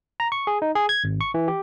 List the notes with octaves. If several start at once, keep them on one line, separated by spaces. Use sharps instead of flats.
A#5
C#6
G#4
D#4
G#4
G#6
G#1
C#6
E3
G4